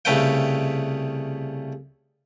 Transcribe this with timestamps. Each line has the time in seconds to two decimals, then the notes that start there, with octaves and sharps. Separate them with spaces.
0.05 C2 C#3 A3 B4 F#5 G5